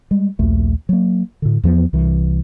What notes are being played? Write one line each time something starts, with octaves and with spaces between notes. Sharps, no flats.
G3 G#3
A#1 D#2 A3
F#3 A#3
A2 D3
E2 F3 B3
C2 E3